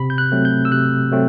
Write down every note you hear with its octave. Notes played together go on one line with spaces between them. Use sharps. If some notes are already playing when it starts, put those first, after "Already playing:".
Already playing: C3 B5
G6
F#6
F#3 A3 C4
G6
E6
C3 F#6
F#3 A3 C4